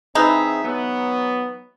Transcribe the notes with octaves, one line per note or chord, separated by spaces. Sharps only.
E3 C4 D#4 G#4 E5
F#3 B3